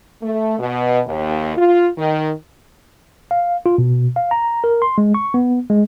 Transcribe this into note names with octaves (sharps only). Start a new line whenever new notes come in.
A3
B2
D#2
F4
D#3
F5
F4
B2
F5
A#5
A#4
C6
G#3
C#6
B3
G#3